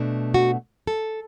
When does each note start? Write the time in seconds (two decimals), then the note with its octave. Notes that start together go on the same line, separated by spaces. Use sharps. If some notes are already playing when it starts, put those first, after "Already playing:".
Already playing: B2 A3 D4
0.34 F#4
0.87 A4